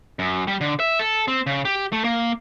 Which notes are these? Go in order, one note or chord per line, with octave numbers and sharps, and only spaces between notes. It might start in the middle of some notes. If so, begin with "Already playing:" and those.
F#2
G3
D3
E5
A4
C4
C#3
G4
A3
A#3